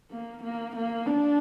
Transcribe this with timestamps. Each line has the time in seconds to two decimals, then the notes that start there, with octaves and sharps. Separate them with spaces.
0.11 A#3
0.43 A#3
0.75 A#3
1.06 D4